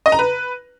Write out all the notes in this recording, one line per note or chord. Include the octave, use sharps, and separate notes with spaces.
D#5
A#5
B4